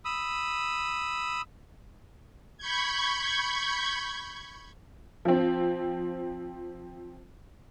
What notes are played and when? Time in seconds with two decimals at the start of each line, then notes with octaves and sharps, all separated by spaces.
0.05 B5 D#6 E6
2.58 B5 C#6 G6 G#6
5.25 F3 C4